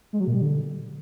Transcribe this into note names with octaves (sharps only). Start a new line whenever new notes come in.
G#3
F#3
A#2
G3
D3